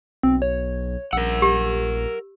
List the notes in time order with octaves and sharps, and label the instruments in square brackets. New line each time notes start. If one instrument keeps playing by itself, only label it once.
[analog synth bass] B1 [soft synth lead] C4
[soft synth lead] C#5
[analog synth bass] A#1 [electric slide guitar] A#4 F#5 [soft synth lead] E6
[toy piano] G4